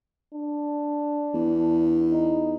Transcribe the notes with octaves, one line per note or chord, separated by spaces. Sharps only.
D4
E2
D#4